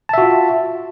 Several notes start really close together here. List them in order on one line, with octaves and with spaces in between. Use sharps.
A5 E5 F#4 F4